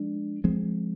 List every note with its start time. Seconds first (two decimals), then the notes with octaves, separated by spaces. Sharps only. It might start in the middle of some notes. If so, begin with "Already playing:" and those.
Already playing: F3 G#3 D4
0.44 F3 G#3 C4